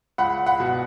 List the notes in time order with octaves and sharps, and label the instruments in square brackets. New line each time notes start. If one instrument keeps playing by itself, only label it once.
[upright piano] C#2 F#5 B5
F#5 B5
B2